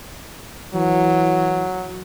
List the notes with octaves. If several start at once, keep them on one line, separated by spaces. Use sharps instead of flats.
E3 F#3